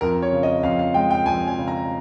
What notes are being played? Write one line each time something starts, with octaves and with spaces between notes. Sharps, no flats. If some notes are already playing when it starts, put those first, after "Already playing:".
F2 A#4
C#5
C#3
D#5
F2 F5
F5
G#3 G5
G5
F2 G#5
G#5
C#3
A#5